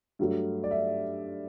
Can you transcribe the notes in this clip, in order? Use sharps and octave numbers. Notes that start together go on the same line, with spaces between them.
G2 F#3 A3
D5
E5